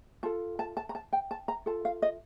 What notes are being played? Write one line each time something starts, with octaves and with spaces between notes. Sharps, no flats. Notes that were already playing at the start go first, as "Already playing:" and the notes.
F4 A4 A5
A5
A5
A#5
A5
G5
A5
A#5
F4 A4 A5
F5
D#5